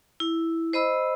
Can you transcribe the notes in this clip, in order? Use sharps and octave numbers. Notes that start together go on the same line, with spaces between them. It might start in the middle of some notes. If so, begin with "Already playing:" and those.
E4
C5 D#5 B5 E6